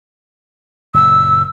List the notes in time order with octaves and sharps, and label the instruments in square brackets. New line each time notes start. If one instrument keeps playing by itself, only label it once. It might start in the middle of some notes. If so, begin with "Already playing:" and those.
[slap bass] F#1 A#2 [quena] E6